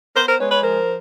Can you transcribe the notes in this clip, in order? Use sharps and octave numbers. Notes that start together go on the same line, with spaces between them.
B3 A#4 C5
A#4 C5
G#3 B4 C#5
B4 C#5
F3 A#4 C5